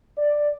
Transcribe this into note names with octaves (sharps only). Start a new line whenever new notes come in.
D5